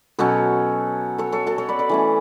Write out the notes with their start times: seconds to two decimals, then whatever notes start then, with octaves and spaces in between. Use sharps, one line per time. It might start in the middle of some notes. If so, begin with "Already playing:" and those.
0.18 B2 F#3 C#4 A4 C#5
1.18 A4 C#5
1.32 A4 C#5
1.47 F#4 A4
1.58 A4 C#5
1.69 B4 D5
1.79 B4 D5
1.89 E3 A3 C#4